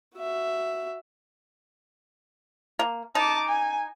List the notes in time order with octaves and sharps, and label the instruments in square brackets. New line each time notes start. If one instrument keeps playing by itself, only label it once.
[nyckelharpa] F#4 E5
[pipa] A#3
[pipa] D#4 [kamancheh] A5 D6
[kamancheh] G#5